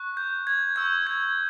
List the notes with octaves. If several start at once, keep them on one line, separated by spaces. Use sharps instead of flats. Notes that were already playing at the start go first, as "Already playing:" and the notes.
Already playing: C#6 F#6
G6
G#6
C#6 E6 G6
G#6